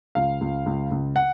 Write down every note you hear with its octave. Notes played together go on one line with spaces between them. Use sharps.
C#2 F5
C#2
C#2
C#2
F#5